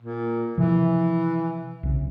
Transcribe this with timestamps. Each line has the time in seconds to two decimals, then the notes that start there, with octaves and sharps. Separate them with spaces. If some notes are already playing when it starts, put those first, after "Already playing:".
0.02 A#2
0.58 C3 E3 F3
1.83 B1 C#3